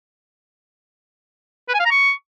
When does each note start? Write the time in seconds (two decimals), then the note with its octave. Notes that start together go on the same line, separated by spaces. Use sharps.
1.69 B4
1.74 G#5
1.80 F5
1.85 A#5
1.91 C#6